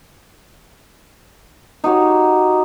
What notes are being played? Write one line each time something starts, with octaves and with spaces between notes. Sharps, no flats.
D#4 F#4 G4 C#5